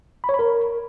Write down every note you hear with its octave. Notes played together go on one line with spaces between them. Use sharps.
B5
C#5
B5
A#4